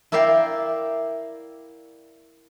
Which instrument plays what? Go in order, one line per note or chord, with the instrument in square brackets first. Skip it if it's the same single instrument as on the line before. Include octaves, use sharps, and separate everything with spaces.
[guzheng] E4 A#4 D5 E5 F5 G5